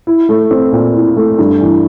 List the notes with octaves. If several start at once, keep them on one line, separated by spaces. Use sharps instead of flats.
E4
A3
C4
A#2
E4
A3
G2
E3